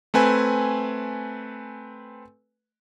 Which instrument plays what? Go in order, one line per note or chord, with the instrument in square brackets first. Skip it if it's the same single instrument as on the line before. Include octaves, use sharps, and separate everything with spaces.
[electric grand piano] A3 C4 B4 G#5